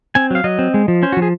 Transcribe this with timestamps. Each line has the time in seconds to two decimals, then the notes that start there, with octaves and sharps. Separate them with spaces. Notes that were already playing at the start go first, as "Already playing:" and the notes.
0.15 C4 G#5
0.31 F#3
0.35 F5
0.44 F#3 D#5
0.59 C4
0.74 G#3
0.88 F3
1.03 C#4 C5
1.12 F#4
1.17 F3
1.22 G#4